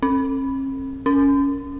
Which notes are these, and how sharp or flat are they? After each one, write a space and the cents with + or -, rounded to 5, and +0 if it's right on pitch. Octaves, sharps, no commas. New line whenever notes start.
C#4 -45
C#4 +10